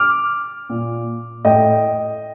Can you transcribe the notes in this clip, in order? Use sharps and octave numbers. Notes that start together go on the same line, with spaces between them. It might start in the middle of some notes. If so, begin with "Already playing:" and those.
Already playing: D6 F6
A#2
A2 D#5 G5